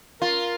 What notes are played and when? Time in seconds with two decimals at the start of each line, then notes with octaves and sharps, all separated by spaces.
0.21 F4 A#4